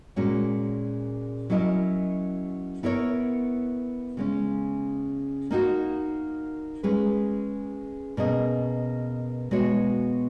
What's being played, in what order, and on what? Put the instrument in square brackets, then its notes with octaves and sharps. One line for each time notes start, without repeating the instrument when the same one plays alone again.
[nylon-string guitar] A#2 G#3 C#4 F#4 C#5
F#3 C#4 E4 A#4 D#5
B3 E4 A#4 C#5
C#3 G#3 C#4
A#3 D#4 F#4
G#3 C#4 G#4 B4
B2 A#3 C#4 G#4 D#5
B2 G#3 B3 F#4 C#5